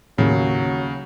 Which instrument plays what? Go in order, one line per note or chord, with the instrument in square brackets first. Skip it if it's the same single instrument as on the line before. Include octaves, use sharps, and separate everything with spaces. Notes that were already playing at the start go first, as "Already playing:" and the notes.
[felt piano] D#2 [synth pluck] A2 [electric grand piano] C#3 [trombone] F#3